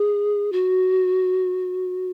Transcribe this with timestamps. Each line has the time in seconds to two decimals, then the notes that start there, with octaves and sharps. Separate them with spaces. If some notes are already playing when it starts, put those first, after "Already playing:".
Already playing: G#4
0.52 F#4